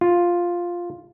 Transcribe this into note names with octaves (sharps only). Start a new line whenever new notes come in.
F4